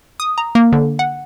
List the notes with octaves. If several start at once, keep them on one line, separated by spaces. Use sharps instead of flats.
D#6
A#5
A#3
D3
F#5